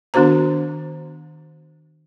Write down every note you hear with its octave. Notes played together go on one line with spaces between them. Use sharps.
D#3 B3 D4 F#4 C5 A#5